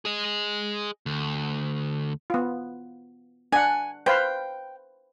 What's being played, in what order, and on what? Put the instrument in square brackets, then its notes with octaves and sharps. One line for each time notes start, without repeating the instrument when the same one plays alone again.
[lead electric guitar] G#4 D#5
D2
[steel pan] B3 F4
[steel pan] D4 F#5 [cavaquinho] G#5
[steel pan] B4 C5 F5 [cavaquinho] G5